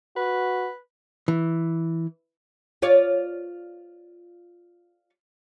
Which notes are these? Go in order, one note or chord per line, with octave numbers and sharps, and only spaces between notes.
F#4 B4
E3
F4 C#5 D5